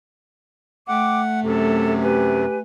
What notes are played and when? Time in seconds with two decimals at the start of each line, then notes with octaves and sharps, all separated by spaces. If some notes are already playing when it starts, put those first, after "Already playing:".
0.88 A3 F#5 G5 D6
1.42 F#2 C3 A4
2.02 G4 B4 G#5